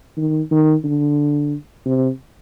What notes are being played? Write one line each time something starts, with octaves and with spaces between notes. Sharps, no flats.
D#3
D#3
D3
C3